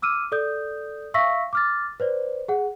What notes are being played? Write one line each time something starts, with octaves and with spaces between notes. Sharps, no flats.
D6 E6 F6 D#7
A4 D5 D#6 G6
E5 F5 C#6 E6 A#6 B6
D6 F6 A6
B4 C5 D5
G#4 F#5